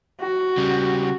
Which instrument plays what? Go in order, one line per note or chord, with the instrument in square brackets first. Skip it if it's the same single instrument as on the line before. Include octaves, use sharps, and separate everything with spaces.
[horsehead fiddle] F#4
[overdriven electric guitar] C#3 G3